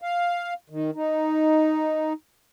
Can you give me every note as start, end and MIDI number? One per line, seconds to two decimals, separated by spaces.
0.02 0.54 77
0.70 0.91 51
0.95 2.13 63